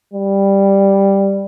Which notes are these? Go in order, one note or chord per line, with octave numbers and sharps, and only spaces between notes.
G3